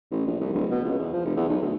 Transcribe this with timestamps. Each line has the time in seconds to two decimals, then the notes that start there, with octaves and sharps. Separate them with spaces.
0.11 A1
0.27 A#1
0.40 C2
0.53 D1
0.71 B2
0.84 C#2
0.98 E2
1.13 F3
1.25 F1
1.36 E2
1.49 B1
1.62 D2